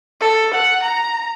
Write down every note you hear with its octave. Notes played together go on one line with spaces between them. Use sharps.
A4
F#5
A#5